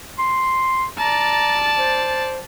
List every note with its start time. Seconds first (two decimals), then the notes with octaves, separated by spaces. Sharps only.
0.19 C6
0.98 D5 A5 A#5
1.77 C5